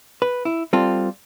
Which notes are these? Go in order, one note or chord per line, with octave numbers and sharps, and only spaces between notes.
B4
E4
G3 C4 F4 A4